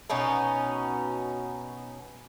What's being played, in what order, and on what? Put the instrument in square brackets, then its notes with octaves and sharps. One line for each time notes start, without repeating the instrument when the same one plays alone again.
[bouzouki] B2 B3 C#4 D#4